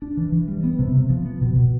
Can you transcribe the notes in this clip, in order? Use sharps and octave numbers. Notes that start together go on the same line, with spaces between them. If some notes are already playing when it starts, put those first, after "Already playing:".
D4
E3
E3
G3
B3
C3
C3
F3
B3
B2
B2